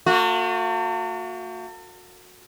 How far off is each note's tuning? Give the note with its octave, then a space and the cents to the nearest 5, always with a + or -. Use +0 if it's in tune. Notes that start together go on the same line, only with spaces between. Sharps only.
A3 +45 F#4 -30